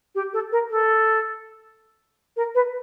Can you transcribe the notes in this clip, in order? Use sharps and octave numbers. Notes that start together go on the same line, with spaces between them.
G4
A4
A#4
A4
A#4
B4